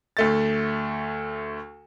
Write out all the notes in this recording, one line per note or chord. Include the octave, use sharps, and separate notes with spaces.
D2 A3 A6